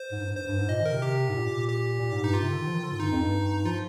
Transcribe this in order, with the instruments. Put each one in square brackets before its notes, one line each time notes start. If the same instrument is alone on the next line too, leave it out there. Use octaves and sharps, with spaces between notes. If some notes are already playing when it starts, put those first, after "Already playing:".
Already playing: [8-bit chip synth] C5
[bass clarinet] G#2
G2
G#2
[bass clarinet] G2 [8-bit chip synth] C5
[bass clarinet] G2
G#2
[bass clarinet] A#2 [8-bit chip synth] D#5
[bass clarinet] D#3 [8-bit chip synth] A#4
[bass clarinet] C3
[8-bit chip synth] G4
[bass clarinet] G#2
A#2
[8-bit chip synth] G4
[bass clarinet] A#2
G#2
[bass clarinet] G2 [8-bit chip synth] D#4
[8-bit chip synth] F4
[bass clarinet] C3
D3
D#3
F3
D#3
D3
G#2
[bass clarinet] G2 [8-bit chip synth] D#4
[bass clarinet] F2
G2
[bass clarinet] F3 [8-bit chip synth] F4